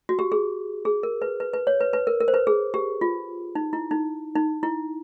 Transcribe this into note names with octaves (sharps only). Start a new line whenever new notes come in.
F#4
G4
G#4
G#4
A#4
B4
B4
B4
C#5
B4
B4
A#4
A#4
C5
B4
G#4
G4
F4
D#4
E4
D#4
D#4
E4